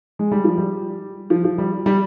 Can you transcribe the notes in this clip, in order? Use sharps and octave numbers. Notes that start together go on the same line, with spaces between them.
G#3
G3
F3
G3
F3
F3
G3
G3